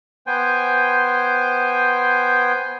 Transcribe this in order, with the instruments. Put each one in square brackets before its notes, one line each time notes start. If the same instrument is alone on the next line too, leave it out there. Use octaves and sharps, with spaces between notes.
[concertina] B3 C5 G5 G#5